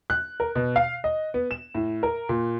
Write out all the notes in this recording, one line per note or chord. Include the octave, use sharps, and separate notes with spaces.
F#6
A#4
B2
F5
D#5
B3
E7
A2
A#4
A#2